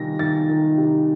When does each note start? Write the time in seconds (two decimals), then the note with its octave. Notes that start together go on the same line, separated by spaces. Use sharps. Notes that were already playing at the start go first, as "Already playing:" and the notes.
Already playing: C3 D#3 G3 A#6
0.19 D#3 A6
0.49 D#3
0.78 C3